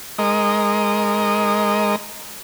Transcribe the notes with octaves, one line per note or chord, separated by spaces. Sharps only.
G#3 A#4 D#5